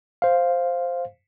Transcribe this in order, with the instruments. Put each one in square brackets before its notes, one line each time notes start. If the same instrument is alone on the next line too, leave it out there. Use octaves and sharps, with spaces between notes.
[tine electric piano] C5 F5